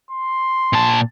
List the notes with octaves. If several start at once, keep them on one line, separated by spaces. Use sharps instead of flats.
C6
A#2 A5